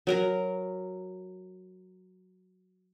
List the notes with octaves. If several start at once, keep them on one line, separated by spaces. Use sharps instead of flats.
F#3 A#4 A#5